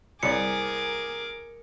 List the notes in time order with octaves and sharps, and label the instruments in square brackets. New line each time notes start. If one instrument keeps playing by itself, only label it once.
[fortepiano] C2 D5 [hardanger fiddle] G#4 [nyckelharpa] A#4 D6 [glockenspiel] C#7